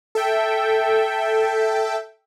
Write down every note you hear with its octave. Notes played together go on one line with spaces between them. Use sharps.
A4 E5 G5